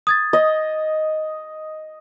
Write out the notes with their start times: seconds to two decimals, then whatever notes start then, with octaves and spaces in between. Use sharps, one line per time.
0.07 D#6 G#6 A6
0.33 D#5